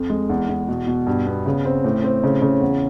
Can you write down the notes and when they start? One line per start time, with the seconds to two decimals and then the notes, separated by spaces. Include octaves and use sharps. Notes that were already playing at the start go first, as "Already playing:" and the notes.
Already playing: F2
0.10 G#3
0.29 E2
0.49 E2
0.68 B2
0.87 B2
1.07 G2
1.27 B3
1.46 C#3
1.65 C4
1.84 A2
2.04 C4
2.24 C#3
2.42 C#3
2.61 E2